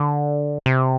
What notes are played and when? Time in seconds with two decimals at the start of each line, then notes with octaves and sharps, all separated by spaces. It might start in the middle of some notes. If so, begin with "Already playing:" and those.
Already playing: D3
0.66 C3